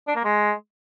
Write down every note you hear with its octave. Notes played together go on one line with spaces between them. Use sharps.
D4
A#3
G#3